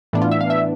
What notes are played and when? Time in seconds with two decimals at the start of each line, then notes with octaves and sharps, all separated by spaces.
0.13 A2 E3 B3 D4
0.22 F4
0.31 E5
0.41 F5
0.50 E5